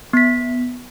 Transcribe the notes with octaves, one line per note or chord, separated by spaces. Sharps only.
B3 B6